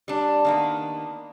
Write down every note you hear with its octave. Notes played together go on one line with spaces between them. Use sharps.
G3 D4
D#3 A#3 B3